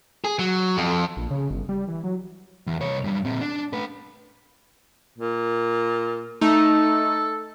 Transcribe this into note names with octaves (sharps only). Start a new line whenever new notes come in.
G#4
F#3
F2
A#1
C#3
G1
G3
E3
F#3
E2
C2 C#5
F#2 G3
A#2 C4
D4
A3 B4
A#2
A3 D#4 A4